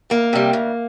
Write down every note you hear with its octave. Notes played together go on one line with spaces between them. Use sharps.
D2 A#3
C3 G3
D2